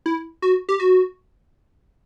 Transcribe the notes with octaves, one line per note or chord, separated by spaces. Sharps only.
E4
F#4
G4
F#4